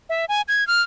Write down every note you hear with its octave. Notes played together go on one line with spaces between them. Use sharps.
E5
G#5
G#6
F6